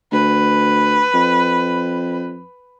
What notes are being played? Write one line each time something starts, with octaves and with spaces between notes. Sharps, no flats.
D2 B4
F2